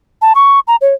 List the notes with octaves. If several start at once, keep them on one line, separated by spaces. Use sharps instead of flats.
A5
C#6
A#5
C#5